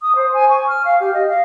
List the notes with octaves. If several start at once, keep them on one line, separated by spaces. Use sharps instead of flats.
D#6
C5
G#5
C#6
F6
F5
G4
D#5
F5